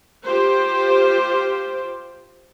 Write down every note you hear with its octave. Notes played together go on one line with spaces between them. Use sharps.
F4 G4 C5